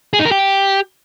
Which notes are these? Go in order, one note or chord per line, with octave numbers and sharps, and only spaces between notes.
G#4
D#4
A#4
G4